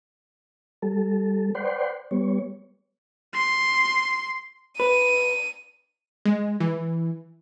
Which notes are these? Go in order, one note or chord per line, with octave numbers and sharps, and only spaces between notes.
G3 A4
B4 C5 D5 F#5 G5 C6
G3 B3 C#5
C6
B4 D#7
G#3
E3